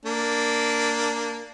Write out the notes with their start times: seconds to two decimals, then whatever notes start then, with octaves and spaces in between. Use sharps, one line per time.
0.05 A#3 D4